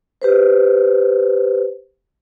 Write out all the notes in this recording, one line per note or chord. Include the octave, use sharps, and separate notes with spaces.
G4 B4 C5